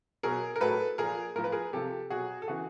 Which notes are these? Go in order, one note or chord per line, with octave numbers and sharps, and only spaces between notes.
B2 F#3 G#4 A#4
A#4
A2 F#3 A4 B4
A#2 F3 G#4 A#4
A2 F3 A#4
B4
G#4 A#4
C3 F3 G4 A4
B2 F#3 F#4 G#4
A4
C#3 E3 F#4 G#4